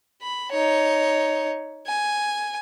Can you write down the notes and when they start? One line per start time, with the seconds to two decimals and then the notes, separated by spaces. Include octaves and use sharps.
0.21 B5
0.51 D#4 C#5
1.87 G#5